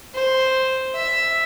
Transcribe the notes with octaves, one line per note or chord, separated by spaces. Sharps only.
C5
E5